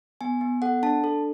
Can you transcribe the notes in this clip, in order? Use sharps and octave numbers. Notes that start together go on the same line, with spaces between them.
B3 G#5
B3
A4 F#5
D4 A5
A4